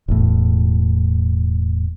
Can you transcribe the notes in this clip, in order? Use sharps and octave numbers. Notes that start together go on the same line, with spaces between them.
E1 A2